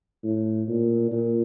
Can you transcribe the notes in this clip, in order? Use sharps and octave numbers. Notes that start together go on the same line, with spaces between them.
A2
A#2
A#2